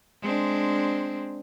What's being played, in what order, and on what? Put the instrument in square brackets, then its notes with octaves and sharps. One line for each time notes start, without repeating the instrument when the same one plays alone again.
[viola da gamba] G#3 C4 D4